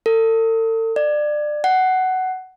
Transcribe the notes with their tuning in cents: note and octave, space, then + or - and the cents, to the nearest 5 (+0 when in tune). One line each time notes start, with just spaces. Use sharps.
A4 +40
D5 +25
F#5 +15